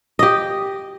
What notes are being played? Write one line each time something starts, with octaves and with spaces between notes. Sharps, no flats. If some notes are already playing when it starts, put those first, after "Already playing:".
G4 D#5